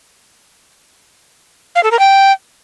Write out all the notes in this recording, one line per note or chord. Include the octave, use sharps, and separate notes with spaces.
F5
A4
A#4
G5